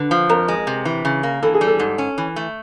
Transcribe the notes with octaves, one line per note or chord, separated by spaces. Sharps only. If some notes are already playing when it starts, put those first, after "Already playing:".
Already playing: D3 B4
F3
F2 A#4
G#3
C3
E3
C#3
A#3
E3 A4
G#4
G3
A4
G#2
C#4
E3
A3